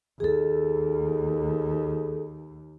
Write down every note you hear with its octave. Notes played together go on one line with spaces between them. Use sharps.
D#2 G#4 A4